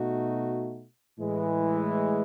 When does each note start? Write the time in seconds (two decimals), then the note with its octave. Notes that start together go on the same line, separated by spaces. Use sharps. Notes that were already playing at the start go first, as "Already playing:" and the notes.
Already playing: B2 A3 D#4 F#4
1.18 A2 E3 G#3